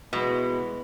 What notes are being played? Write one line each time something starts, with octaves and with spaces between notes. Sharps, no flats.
B2 E3 G#3 B3